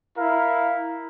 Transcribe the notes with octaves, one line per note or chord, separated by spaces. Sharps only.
E4 A#4 F5